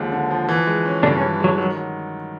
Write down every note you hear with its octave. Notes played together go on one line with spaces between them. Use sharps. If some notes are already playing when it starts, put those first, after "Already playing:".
Already playing: D#2 D3 F3 G#3
D3
F3
E3
G#3
C#4
G2 D3 D4
C#3 C#4
E3
F#3 G#3
D#3 F#3
F#3